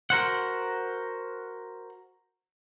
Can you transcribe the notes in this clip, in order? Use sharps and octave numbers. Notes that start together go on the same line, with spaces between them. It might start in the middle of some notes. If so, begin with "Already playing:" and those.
F#4 A#4 C5 F#5